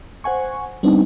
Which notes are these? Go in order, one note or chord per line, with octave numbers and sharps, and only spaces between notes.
C5 F#5 G#5 C#6
G3 B3 C4 D4 D#4